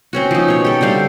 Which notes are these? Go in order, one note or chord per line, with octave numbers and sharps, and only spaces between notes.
C4 C#4 F#4
F3 D#4
B2 C#5
G4 A4
D3 G3 C5 F5